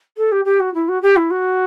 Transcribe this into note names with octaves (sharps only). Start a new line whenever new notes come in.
A4
G4
G4
F#4
E4
F#4
G4
E4
F#4